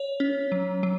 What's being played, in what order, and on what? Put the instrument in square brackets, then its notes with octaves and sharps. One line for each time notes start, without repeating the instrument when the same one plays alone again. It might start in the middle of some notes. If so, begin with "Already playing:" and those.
Already playing: [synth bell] C#5
C#4
F#3
F#3